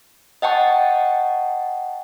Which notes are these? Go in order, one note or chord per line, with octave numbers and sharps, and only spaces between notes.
D#5 F#5 G5 A5 C#6